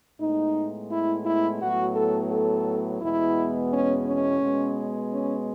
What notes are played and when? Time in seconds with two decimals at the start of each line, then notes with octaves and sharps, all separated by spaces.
0.19 A2 G#3 B3 D#4
0.90 E4
1.24 E4
1.60 A2 F#3 B3 F#4
1.94 A4
2.30 A4
3.00 E2 B2 G#3 B3 E4
3.70 C#4
4.06 C#4
4.41 B2 G#3 B3
5.11 C#4